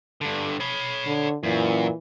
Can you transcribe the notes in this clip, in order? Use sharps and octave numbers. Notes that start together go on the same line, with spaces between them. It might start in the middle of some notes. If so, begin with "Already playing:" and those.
G2 D3
C#5 B5
D3
F#2 A#2 E3